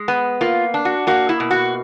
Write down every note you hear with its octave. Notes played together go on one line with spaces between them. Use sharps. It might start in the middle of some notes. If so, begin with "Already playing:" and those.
Already playing: G#3
B3
A#3 F4
D4
F#4
A#3 F#4
E4
B2
F#4